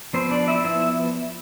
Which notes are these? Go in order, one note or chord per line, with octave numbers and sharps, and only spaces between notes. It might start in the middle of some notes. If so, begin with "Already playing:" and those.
F3 B3 C4 C5
D4 D5
E4 E5
F3 B3 E4 E5